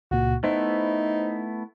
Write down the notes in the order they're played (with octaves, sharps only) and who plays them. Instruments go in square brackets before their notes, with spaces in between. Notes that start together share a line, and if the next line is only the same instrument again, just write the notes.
[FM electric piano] C#2 A#2 [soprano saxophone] F#4
[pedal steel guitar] A3 B3 E4 [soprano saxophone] D#4 [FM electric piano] C5